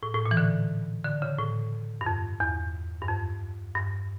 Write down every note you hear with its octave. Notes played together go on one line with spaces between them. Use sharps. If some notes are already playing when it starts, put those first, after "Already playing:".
A2
A2
A#2
E3
D3
D3
C#3
A2
G2
F2
E2
G2
F2
G2